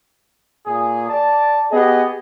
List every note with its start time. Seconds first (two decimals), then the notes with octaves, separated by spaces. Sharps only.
0.67 A#2 G#4
1.09 D5 A5
1.72 B3 G4 G#4 D#5